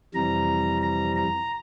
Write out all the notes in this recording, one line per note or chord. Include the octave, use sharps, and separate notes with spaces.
F2 C3 E3 G3 A#5
A#5
A#5